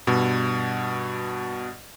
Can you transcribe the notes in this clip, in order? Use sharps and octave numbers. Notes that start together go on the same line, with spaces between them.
G2 B2